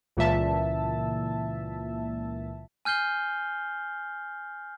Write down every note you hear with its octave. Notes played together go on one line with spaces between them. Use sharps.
C#2 A#2 E3 E5 A5
G#5 F6 G6 C7 G7